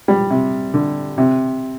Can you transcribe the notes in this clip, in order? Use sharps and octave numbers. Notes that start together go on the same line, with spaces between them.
G3
C3
D3
C3